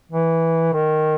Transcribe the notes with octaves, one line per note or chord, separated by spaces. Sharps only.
E3
D#3